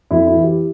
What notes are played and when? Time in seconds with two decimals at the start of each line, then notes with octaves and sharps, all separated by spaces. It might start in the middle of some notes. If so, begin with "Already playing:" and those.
0.11 F2 E4
0.26 E4
0.35 E3
0.43 G4